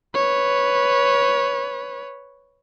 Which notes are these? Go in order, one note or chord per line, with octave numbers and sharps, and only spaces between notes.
B4 C#5